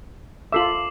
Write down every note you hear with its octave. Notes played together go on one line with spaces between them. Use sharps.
F4 A4 E5 D6 C7 F#7